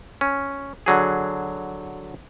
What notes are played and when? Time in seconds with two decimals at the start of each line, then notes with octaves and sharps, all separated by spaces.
0.21 C#4
0.86 D3 F#3 G#4